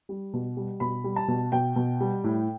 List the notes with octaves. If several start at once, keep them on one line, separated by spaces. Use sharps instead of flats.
G3
B2
G3
B2 B5
G3
A5
B2
B2 G5
B2
G3
A2